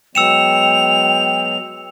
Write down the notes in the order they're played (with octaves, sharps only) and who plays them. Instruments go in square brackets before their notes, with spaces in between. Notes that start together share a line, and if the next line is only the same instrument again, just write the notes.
[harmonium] F#3 G#3 B3 [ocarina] G5 [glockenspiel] E6 C#7 E7 [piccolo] F7